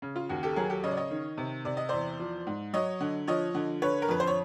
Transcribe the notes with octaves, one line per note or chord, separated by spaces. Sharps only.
C#3
F4
D#2 F#4
G4 A4
F#3 G#4 A#4
G4 A4
C#3 C#5 D#5
D5
C#5 D#5
D#3
C3
C3 D5
D#5
E2 C5 D5
F3
G#2
F#3 C#5 D#5
D3
F3 C#5 D#5
D3
D3 B4 C#5
A#4
F2 B4
C5
C#5